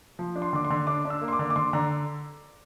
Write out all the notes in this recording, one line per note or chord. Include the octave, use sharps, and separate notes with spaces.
F3
D4
C6
D3 D6
C6
D3
D4 D6
D4
E6
A#3
C6
D6
D3
D6
D3 C6
D3 A#5